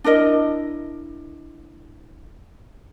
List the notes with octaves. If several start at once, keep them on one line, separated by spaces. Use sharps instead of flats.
D4 E4 A#4 D#5